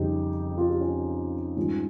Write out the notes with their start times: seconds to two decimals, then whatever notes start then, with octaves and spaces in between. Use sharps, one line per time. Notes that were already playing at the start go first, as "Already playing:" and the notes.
Already playing: F2 C#3 G3 D#4 G4
0.58 F4
0.70 G4
0.80 C#4 F4
1.56 G#2 D#3 G3 C#4 F4